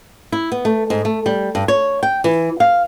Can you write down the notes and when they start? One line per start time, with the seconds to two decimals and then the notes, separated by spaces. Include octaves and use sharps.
0.32 E4
0.52 B3
0.65 A3
0.90 G#2
1.05 A3
1.26 G3
1.55 G2
1.68 C#5
2.03 G5
2.24 E3
2.60 F5